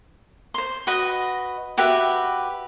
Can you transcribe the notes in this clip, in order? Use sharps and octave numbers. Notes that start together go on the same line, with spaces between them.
C5 C6
F#4 B4 D#5
F#4 G4 B4 E5